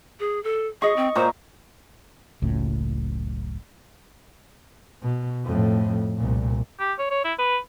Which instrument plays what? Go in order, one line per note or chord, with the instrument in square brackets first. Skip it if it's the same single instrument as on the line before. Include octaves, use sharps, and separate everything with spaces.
[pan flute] G#4
A4
[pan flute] G#4 [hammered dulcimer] D#5 C#6
[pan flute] C4
[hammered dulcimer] A#2 A#5 C#6 [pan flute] C5
[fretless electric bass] F#1 C#2 F#2 A2
[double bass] B2
F2 A2
C2 A#2
[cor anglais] G4
C#5
C#5
E4
B4